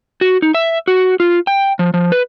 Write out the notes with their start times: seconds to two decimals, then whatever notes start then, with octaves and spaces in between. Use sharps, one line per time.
0.21 F#4
0.42 D#4
0.55 E5
0.88 F#4
1.20 F4
1.47 G5
1.79 F3
1.94 F3
2.12 B4